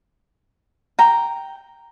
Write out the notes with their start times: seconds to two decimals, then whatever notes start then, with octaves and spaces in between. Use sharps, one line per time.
0.99 G5 A#5